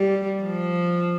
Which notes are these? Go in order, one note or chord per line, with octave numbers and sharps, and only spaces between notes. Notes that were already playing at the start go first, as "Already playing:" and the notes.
Already playing: G3
F3